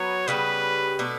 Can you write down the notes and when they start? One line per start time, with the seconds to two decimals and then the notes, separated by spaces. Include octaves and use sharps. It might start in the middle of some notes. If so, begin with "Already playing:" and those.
Already playing: F#3 B3 F#4 C#5
0.28 C#3 G3 B3 B4
0.99 B2 A3 D4